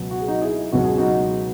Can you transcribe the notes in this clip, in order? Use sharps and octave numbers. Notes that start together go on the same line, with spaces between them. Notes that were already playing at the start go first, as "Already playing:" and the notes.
Already playing: C#2 B2 F#3
F#4
G#4
D#4 F#4
E4 G#4
C#2 B2 F#3 F#4
G#4
D#4 F#4